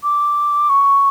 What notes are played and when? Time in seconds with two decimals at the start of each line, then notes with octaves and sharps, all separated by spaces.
0.04 D6
0.70 C#6